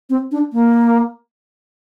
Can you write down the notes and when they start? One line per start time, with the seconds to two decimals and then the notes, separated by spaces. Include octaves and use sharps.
0.10 C4
0.32 D4
0.53 A#3